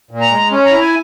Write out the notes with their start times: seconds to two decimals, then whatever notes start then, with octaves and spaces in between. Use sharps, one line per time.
0.11 A#2
0.21 A#5
0.31 G#3
0.51 C#4
0.66 A#5
0.71 E4
0.81 G#5